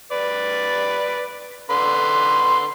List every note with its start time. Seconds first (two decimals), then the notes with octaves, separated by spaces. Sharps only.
0.12 B4 D5
1.70 D3 B4 C6